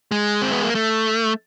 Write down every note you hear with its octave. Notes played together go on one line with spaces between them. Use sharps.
G#3
C4
B3
A#3
A3